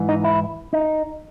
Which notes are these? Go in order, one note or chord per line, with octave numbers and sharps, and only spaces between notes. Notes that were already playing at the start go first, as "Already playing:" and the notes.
Already playing: G#2 E3
D#4
E4
D#4